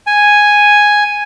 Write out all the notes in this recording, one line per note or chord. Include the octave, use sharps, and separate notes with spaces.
G#5